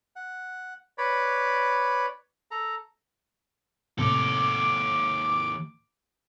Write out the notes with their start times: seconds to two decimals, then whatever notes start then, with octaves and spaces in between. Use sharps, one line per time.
0.16 F#5
0.98 B4 C#5 D5 B5
2.51 A4 A#5
3.99 D#2 A2 C3 A4 D6